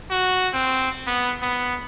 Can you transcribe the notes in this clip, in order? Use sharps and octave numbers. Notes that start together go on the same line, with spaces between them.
F#4
C4
B3
B3